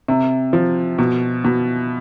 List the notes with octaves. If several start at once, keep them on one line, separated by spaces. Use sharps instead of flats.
C3
F3
B2
B2